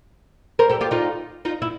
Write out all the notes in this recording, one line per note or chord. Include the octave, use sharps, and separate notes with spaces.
A#4 C5
G4 A4
F4 G4
D#4 F4
D#4 F4
E4